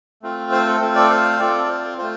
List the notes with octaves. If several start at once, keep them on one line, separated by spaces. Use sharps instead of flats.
A3 C4 F4
C5
A4
A3 C4 F4 C5
A4 D5
C5 F5
C4 F4 A4 D5
A4
C5
A3 F4 C5